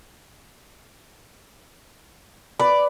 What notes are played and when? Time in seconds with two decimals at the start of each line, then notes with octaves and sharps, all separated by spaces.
2.60 B4 D5